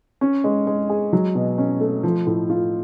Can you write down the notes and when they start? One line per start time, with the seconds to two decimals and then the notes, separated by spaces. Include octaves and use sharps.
0.21 C#4
0.44 G#3
0.67 G#3
0.89 G#4
1.13 F#3
1.35 B2
1.58 C#4
1.81 A3
2.03 F3
2.27 A2
2.50 F4